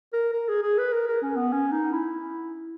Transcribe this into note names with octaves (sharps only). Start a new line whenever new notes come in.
A#4
A#4
G#4
G#4
B4
A#4
A#4
C#4
B3
C#4
D#4
E4